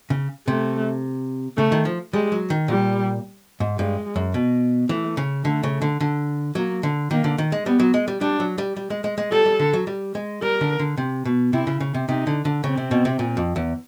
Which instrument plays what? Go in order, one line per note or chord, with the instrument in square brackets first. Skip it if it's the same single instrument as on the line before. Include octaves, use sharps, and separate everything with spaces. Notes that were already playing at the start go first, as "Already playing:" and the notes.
[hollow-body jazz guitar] C#3
[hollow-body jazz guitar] C3 [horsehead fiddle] A3
[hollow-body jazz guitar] C#3 [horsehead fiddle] A3
[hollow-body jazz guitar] D#3
F3
[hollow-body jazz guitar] G3 [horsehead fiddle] G#3
[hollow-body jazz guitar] F#3
D#3
[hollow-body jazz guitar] A#2 [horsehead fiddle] G3
[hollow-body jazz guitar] G#2
[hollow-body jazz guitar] G2 [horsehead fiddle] G#3
[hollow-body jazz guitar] F#2
B2
[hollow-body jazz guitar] E3 [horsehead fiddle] A3
[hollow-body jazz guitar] C#3
[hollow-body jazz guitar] D3 [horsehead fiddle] A3
[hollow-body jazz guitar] C#3
D3
D3
[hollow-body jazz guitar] F#3 [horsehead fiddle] A#3
[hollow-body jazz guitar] D3
[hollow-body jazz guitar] D#3 [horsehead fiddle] A#3
[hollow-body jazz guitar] D3
D#3
G#3
[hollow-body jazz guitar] G3 [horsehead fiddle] B3
[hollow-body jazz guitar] F#3
G#3
G3
[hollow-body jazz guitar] G3 [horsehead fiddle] D4
[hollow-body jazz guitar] F#3
G3
G3
G#3
G#3
G#3
[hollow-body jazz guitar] G3 [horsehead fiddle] A4
[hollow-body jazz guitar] G3
D3
F#3
G3
G#3
[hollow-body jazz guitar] G3 [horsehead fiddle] A#4
[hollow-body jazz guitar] D3
D3
C3
B2
[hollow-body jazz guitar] C3 [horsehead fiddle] E4
[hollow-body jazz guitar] C#3
C#3
C3
[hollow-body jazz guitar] C3 [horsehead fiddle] D#4
[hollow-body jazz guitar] D3
D3
[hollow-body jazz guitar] C#3 [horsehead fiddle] C4
[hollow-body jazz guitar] C3
B2
C3
A#2
F2
E2